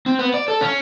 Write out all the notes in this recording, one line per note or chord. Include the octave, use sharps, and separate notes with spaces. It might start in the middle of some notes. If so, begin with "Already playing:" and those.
C4
B3
D5
A4
C#4